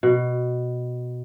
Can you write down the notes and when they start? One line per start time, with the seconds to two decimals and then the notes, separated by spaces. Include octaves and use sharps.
0.03 B2